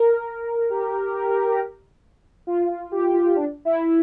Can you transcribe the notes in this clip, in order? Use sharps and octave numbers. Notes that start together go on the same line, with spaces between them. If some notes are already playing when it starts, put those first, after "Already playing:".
Already playing: A#4
G4
F4
F4
G4
F4
D4
E4